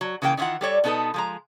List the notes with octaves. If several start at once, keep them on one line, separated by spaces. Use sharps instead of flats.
F#3
C#3 E3 A#3 G4 G5
D#3 E3 E4 F4 F#5
G3 A4 C#5 D5
B2 B3 D#4 A4 B4
F3 G#3 A#5